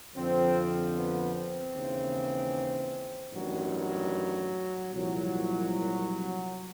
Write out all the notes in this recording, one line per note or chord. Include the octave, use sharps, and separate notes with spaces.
F2 D3 F3 C4
B3
C4
D#2 C#3 E3
A1 G2 D#3 F#3
F#3
C2 A#2 F3 F#3